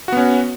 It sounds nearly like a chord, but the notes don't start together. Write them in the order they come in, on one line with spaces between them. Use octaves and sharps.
F#4 B3 C#4